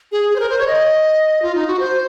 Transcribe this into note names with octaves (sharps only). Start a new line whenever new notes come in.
G#4
G#4
C5
A#4
C5
C#5
D#5
F4
D#4
F#4
C5